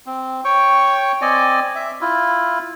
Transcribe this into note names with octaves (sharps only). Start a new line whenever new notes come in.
C4
C#5 G5 C#6
C4 D5 D#5 G#5
E5
E4 F4